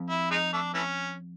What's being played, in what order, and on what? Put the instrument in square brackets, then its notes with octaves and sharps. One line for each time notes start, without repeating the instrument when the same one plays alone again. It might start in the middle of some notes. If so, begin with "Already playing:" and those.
Already playing: [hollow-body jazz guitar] F2
[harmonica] E4
G#3 D#4
A3 D4
E3 A3 C#4